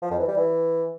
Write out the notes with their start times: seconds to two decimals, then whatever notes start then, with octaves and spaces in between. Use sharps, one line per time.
0.02 F3
0.11 F2
0.19 E3
0.28 G3
0.37 E3